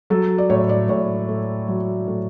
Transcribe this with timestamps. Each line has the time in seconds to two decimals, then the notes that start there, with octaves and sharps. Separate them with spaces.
0.10 F#3 A4
0.38 D5
0.50 A2 C#5
0.69 D5
0.89 A2 C#5
1.28 A3
1.68 F#3
2.07 A2